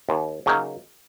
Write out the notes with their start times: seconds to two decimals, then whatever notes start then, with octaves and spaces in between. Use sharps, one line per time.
0.09 D#2
0.46 C#3 F#3 A#3 D#4